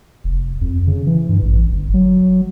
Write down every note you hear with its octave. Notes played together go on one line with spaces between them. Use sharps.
F1
F2
C#3
E3
G2
A1
G1
F#3